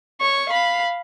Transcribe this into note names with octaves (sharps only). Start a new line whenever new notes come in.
C#5 C#6
F5 B5